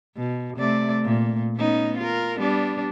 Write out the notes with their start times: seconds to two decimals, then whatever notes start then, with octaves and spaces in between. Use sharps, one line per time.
0.17 B2
0.57 C3 A3 D5
1.05 A#2
1.57 B3 C#4 D#4
1.98 F4 A#4
2.38 G3 B3 D4